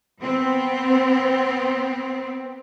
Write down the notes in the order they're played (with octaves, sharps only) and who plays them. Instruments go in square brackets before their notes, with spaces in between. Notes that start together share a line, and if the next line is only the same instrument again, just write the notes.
[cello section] B3 C4